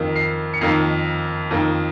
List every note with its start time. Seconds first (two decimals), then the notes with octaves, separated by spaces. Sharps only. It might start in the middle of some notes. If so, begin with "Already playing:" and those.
Already playing: F2 D#3 A#3
0.16 C7
0.54 C#7
0.61 F2 D#3 A#3 C7
1.51 F2 D#3 A#3